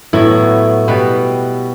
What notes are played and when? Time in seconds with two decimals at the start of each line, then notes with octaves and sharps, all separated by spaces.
0.13 A2 F#3 B3 E4
0.88 B2 G3 B3 B4